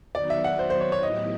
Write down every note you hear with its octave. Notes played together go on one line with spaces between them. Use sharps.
D#3 F#3 B3 D#4 F#4 D5
E5
F#5
C5
C5
C#5
C#5
A2 F#3 B3 E4 G4 D#5